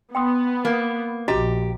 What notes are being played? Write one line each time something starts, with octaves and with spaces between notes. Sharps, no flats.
B3 G5 C6 D#6
A#3
A#1 F#4 G4 D#5 A#5